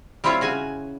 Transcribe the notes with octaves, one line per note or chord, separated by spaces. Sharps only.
G3 C4 E4 F4 C#5
C#3 F#4 G#5